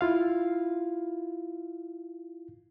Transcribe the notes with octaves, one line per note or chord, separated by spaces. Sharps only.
E4 F4 F5